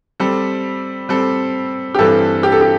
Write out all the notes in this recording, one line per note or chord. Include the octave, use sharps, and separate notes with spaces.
G3 C4 A4
G3 C4 A4
G4
G2 E3 G3 C4 A4
G4
A4
G4